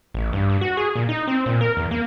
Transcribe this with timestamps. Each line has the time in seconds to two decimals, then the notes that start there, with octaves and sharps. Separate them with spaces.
0.14 A1
0.33 G2
0.50 G2
0.61 F#4
0.77 G#4
0.96 A#2
1.09 D#4
1.28 C4
1.46 A#2
1.61 A#4
1.77 E2
1.91 A#3